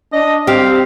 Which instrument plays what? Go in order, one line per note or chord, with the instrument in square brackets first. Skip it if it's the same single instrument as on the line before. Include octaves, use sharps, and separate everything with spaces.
[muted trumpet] D4 [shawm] D#5
[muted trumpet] C4 [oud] G4 [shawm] F5